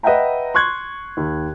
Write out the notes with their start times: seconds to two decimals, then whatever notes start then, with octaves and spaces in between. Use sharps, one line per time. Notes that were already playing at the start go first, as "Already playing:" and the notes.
0.03 B4 D#5 E5 F#5 G5 A#5
0.55 C6 C#6 F#6 G#6
1.17 D#2